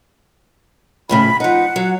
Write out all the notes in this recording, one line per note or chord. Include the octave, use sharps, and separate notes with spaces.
F2 A2 C#3 B5
F3 D#4 F#5
F#3